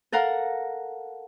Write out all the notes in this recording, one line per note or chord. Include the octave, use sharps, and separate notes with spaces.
A4 A#4 F5 F#5 A#5